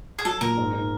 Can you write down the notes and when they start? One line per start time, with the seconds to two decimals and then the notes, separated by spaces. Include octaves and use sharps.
0.19 G#4
0.25 F#3 A4
0.41 A#2 A#4
0.57 G#2
0.73 G#2